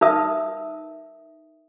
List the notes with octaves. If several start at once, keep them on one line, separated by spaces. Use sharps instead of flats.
D#4 A#4 B4 E5 D#6